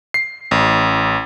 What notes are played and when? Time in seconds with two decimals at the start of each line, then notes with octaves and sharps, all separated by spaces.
0.14 C7
0.51 A1